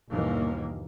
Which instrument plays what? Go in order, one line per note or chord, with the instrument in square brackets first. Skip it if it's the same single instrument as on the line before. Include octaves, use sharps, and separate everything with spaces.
[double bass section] G1 D#2 B2 E3 A#3